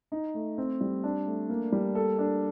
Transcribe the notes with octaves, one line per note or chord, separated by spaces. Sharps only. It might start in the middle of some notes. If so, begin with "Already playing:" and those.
D#4
A3
C4
G3
D4
A3
A#3
G3
A4
D4